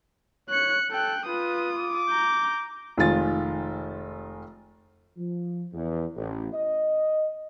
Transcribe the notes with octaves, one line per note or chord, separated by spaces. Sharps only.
C#5 F#6 C#7
A4 G5 F#6
F4 B4 D#6
D6
A#5 G6
F1 D#3 G#3 F4 A6
F3
E2
A1
D#5